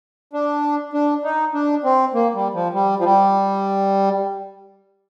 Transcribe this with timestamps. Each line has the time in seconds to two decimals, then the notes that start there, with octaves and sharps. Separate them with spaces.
0.33 D4
0.93 D4
1.24 D#4
1.54 D4
1.84 C4
2.14 A#3
2.34 G3
2.54 F3
2.74 G3
2.99 F3
3.04 G3